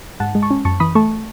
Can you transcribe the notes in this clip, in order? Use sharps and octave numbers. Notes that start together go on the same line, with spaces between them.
G#2 F#5 A5
G#3
A5 C#6
C#4
F#2 A5 C#6
E3 B5 D#6
A3 A5 C#6